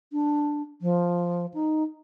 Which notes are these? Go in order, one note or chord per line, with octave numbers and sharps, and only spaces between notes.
D4
F3
D#4